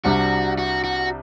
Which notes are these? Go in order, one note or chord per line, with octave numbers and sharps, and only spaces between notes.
C2 C3 G3 D4 F#4
F#4
F#4